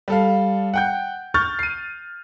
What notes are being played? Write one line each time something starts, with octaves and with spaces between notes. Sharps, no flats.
G3 A4 F5
F#5 G5 G6
C#6 F6 G6 A6
C7 D#7